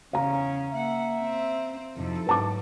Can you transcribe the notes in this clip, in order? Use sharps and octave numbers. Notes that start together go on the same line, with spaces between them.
E2 C#3 C#4 F5 A#5
A#3 E5 F#5
C4
F2 C3 D#4 E4 A4
G#2 F#3 B4 A5 D6